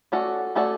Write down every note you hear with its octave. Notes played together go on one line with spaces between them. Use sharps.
A3 C#4 F#4 A4 D5
A3 C#4 F#4 A4 D5